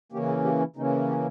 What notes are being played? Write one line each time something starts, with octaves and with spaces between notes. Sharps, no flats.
C#3 E3 A#3 C#4 G4
G#4
G4
E4
C#3 E3 A#3 C#4 D#4
G4